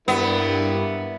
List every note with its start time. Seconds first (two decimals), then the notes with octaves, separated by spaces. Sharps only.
0.08 G2 G3 A#3 B3 E4